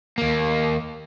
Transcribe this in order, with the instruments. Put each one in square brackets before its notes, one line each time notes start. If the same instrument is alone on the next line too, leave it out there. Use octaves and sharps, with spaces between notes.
[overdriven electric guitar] D#2 A#3